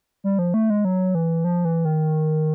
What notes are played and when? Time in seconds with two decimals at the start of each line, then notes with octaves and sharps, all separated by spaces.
0.24 G3
0.39 F3
0.54 A3
0.70 G#3
0.85 F#3
1.15 E3
1.44 F3
1.65 E3
1.85 D#3